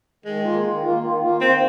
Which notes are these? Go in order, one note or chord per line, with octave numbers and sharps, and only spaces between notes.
D#3 G#3
A#3 F4
D#3
A#3 F4
D#3
A#3 F4
D#3 C4